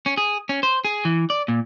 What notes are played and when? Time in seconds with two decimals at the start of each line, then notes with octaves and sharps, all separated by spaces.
0.06 C#4
0.17 G#4
0.49 C#4
0.63 C5
0.85 G#4
1.05 E3
1.30 D5
1.48 A#2